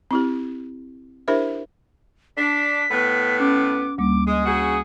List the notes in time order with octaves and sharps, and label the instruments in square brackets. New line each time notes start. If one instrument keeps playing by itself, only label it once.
[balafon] C4 E4 G4
D4 E4 G4 A#4 C5 E5
[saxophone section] D4 [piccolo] B6
[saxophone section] A2 B3
[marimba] C#4 [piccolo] D6
[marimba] D2 G3 A#3 [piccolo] D6
[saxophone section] G#3 [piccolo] D#6
[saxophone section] C#3 F#4 G#4